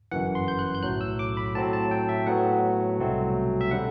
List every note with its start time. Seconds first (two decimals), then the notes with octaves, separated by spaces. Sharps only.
0.11 G1 F#2 E3 F#5
0.35 C6
0.48 G6
0.59 F#6
0.75 G6
0.83 B1 A2 F#3 F#6
1.01 E6
1.19 D6
1.37 B5
1.55 A2 F#3 C4 A5
1.73 A5
1.91 G5
2.09 E5
2.27 A2 F#3 B3 F#5
2.99 C2 B2 F#3 A3 C4
3.61 E5
3.71 D3 G3 C4 F#5